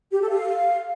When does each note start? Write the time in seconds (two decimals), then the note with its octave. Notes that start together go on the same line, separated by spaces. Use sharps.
0.11 G4
0.21 A4
0.30 F5